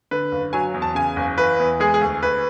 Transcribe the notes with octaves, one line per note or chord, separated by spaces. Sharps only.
D3 B4
F#1
F#3 G#5
E2
A5
C#3 G#5
F#1
E3 B4
E2
G#3 G#4
G#4
D2
D2 B4